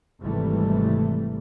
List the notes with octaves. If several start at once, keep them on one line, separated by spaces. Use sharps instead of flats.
G#1 C3 E3 G3 A3